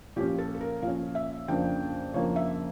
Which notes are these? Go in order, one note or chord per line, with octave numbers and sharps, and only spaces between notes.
A#2 F3 C#4 G4
A4
A4
A#4
A#2 F3 C#4 F5
E5
F2 C#3 F3 A#3 D4 G5
F2 C#3 F3 A#3 D4 C#5
E5